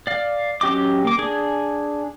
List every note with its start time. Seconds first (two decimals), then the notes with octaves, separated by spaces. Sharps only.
0.07 D5 F5
0.61 F#3 C#4 G4 D#5 D6
1.05 A#3 D6
1.19 D4 G#4 G#5